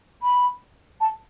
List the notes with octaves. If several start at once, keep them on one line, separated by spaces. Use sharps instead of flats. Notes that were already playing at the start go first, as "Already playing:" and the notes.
B5
A5